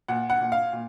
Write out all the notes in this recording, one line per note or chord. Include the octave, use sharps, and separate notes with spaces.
A#2 F#5
F#5
A#2
F5
A#2